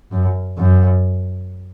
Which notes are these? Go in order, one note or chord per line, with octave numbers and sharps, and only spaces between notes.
F#2
F#2